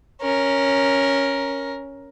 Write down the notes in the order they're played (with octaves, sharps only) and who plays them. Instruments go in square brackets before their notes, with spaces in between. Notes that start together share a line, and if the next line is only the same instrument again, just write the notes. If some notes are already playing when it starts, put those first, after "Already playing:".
[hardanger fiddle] C#4 A#4